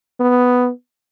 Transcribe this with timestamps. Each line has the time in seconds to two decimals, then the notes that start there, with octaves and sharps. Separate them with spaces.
0.20 B3